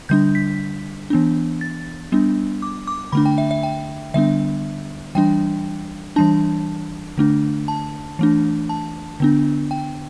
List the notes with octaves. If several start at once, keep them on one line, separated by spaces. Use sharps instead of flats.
D3 G3 D4 G6
B6
E3 B3 D4
A6
G3 B3 D4
D6
D6
D3 A3 D4 B5
G5
E5
E5
G5
D3 G3 B3 D4 E5
E3 G3 D4 G5
E3 G3 D4 A5
D3 A3 D4
A5
E3 A3 D4
A5
D3 B3 D4
G5